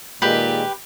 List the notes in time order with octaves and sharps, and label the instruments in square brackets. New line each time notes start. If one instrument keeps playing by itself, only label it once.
[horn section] A#2 D#3 G#3 [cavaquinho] G4 B4